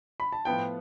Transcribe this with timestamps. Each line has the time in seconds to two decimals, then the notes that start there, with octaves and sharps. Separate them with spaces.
0.20 B5
0.32 A5
0.45 A2 F3 B3 F4 G5